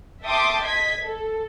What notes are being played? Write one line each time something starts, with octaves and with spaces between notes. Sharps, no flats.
E5 G5 A5 C6 D6 D#6
D#5 G#6 B6
A4